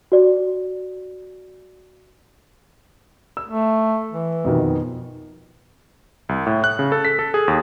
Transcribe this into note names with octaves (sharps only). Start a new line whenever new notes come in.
F#4 D5
E6
A3
E3
F2 B2 D#3
C2
A2
F#6
C#3
A4
B6
A4
G#4
D#2